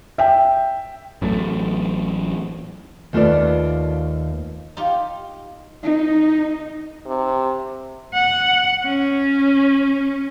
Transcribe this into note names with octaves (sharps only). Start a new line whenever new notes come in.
E5 G5
A1 F#3 A3
D#2 A3 F4 A4 B4 D5
D#4 F4 G4
D#4
C3
F#5
C#4